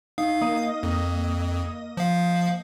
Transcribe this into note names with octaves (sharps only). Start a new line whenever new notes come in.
D#4 F5
A#3 D#5 D#6
F2
F3 F5